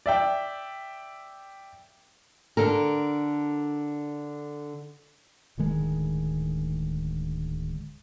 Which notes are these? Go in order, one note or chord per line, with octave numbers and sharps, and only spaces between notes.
D5 E5 G5
D3 A4 A#4
D1 D2 D#3 G#3